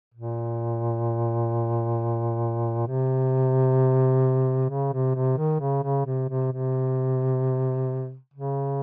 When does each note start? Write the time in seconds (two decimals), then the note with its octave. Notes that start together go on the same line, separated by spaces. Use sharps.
0.14 A#2
2.87 C3
4.69 C#3
4.93 C3
5.15 C3
5.38 D#3
5.61 C#3
5.83 C#3
6.06 C3
6.29 C3
6.52 C3
8.33 C#3